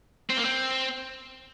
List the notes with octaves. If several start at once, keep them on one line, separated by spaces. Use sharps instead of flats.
C4
A#3
C4